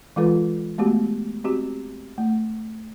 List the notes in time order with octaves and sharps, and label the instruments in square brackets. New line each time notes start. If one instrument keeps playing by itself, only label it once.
[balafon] E3 G#3 F4 A4 B4
G#3 A3 B3 F#4 G4
C4 F#4 G4
A3